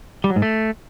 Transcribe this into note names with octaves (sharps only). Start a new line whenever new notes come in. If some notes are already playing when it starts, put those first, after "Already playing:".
G3
F#3
G#2
A3